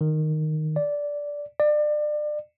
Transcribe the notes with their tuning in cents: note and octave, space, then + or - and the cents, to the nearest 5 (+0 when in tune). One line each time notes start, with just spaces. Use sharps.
D#3 -10
D5 -10
D5 +30